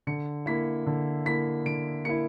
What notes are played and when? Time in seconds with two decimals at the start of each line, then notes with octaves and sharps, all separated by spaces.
0.07 D3 C#7
0.46 A#3 E4 B6
0.86 D3
1.26 A#3 E4 B6
1.66 D3 D7
2.05 A#3 E4 C#7